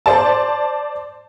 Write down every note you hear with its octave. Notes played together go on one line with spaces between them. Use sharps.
C5 D5 A5